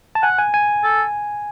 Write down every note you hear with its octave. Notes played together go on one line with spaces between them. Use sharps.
A5
F#5 G#5
G#5
G#5
A4